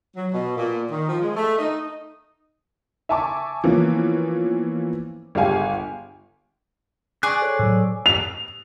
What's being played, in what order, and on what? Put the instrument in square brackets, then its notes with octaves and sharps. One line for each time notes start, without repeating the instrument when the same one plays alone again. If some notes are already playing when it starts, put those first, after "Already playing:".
[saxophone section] F#3
B2
A#2
D#3
F3
G#3
A3
D#4
[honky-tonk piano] E5 G#5 A5 C#6 D6
E3 F3 A#3 B3 C#4
G1 G#3 G4 F5 G#5
[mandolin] G#4 D5 [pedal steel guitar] C#6 D6 F#6
[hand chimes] A4 C5 C#5
[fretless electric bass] A2 F#3 [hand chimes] A4 E6
[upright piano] F7